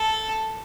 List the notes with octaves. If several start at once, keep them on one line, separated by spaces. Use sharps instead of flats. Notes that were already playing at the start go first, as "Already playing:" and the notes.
Already playing: A4